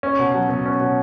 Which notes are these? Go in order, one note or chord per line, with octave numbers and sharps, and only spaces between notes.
C#4
B2
F#3
B2
C#4
B2